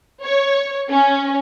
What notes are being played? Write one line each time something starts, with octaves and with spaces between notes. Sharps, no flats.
C#5
C#4